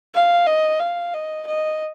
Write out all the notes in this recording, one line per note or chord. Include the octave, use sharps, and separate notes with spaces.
F5
D#5
F5
D#5
D#5